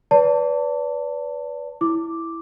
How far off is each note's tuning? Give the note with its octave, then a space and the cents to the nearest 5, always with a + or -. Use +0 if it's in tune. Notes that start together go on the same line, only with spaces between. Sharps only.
B4 +0 D5 -35 A5 +30
E4 +0 D6 +0